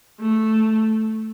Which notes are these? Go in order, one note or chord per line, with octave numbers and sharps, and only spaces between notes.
A3